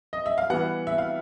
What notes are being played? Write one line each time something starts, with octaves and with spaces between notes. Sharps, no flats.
D#5
E5
F5
E3 G3 B3 F#5
E5
F5